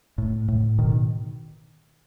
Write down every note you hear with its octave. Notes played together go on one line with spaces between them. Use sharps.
A2
A2
B2 D#3